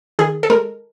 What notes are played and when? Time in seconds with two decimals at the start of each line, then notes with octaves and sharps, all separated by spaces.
0.19 D#3 G#4
0.43 A4
0.50 G#3 A#4